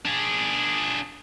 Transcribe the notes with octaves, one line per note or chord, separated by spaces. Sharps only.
D4 G#4